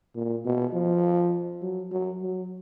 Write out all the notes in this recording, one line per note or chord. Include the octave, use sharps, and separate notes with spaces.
A#2
B2
F3
F#3
F#3
F#3